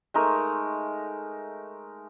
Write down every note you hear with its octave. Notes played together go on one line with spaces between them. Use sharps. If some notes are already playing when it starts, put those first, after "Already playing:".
G#3 A3 D#4 A#4